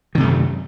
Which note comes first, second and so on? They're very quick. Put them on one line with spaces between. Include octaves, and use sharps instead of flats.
D#3 C3 A3 F#2